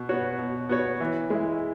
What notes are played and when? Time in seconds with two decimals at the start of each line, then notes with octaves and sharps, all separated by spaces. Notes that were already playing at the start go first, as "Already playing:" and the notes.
Already playing: B2
0.09 B3 F#4 C#5
0.39 B2
0.69 B3 F#4 C#5
1.00 E3
1.30 G#3 E4